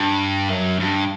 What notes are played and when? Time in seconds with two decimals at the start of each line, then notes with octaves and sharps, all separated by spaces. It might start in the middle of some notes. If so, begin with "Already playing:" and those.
Already playing: G2
0.49 F#2
0.79 G2